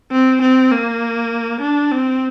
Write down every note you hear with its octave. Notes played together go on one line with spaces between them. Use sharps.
C4
C4
A#3
D4
C4